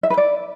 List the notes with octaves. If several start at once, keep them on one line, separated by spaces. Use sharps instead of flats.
E5
B4
D5